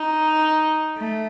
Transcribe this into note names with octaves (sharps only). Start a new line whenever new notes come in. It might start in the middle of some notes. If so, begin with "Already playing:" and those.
Already playing: D#4
A3